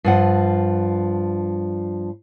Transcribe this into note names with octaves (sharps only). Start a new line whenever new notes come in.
G2 F3 F#5